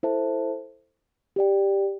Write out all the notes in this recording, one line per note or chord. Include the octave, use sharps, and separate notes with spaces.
E4 A4 C5 E5 A5
G4 D5 G5